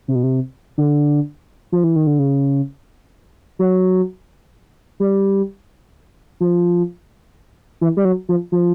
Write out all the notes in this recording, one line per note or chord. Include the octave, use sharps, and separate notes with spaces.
C3
B2
C3
D3
F3
E3
D#3
D3
C#3
F#3
G3
F3
E3
G3
F#3
F3
F3